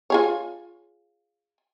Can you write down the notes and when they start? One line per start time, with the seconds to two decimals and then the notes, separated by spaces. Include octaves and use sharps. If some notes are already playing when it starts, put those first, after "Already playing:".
0.10 F4 G#4 C#5